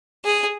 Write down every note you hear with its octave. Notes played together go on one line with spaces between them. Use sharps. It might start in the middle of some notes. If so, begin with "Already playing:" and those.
G#4